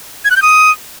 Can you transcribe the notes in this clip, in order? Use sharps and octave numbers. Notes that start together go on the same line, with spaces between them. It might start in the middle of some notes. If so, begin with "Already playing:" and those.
G#6
F#6
G6
D#6